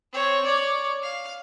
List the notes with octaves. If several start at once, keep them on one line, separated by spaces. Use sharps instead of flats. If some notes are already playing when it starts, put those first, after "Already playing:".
C4 C#5
C#5 D5
F5